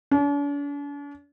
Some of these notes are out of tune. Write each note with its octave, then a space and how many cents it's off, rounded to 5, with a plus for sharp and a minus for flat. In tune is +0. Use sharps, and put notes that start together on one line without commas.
D4 -45